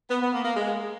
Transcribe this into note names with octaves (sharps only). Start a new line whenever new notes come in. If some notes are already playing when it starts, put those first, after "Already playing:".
B3
B3
A#3
A#3
G#3